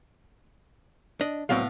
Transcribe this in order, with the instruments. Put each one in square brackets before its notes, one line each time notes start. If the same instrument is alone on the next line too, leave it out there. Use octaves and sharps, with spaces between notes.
[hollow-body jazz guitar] D4 D#5
[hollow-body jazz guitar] C2 F#3 C4 [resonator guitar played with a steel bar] A2 B3 F5